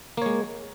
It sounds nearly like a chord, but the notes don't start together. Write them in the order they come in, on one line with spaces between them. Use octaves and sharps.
A#3 C#5 G#3